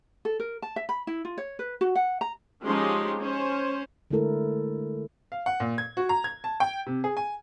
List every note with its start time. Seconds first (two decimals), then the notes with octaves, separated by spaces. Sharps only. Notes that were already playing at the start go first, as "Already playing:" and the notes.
0.25 A4
0.40 A#4
0.62 A5
0.76 E5
0.89 B5
1.07 E4
1.25 F4
1.38 C#5
1.59 B4
1.81 F#4
1.95 F#5
2.21 A#5
2.65 F3 G#3 C#4 D#4 G4 C6
3.19 C#4 C5
4.11 D3 G#3 A3 E4 A4 A#4
5.32 F5
5.46 F#5
5.60 A#2
5.78 G#6
5.97 F#4
6.09 A#5
6.24 G#6
6.44 A5
6.60 G5
6.87 C3
7.04 G#4
7.17 G#5